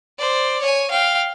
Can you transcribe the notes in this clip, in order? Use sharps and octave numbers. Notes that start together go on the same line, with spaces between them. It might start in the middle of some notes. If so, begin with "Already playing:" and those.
C5 D5
C#5 G#5
F5 G5